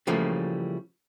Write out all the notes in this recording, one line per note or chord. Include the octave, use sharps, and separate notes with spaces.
C#3 E3 F3 G3 A3 A#3